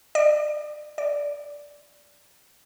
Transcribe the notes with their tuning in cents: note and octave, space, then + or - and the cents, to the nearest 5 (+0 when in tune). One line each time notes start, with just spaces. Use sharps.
D5 +30
D5 -15